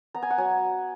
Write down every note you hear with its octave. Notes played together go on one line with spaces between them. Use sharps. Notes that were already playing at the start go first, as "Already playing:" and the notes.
B3 A#5
G#5
F#5
F#3 G#5